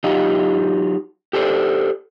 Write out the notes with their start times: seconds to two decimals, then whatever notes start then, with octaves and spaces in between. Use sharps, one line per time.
0.04 F#3 D#4 F4 G4 D#5
1.33 G4 A4 C5 D5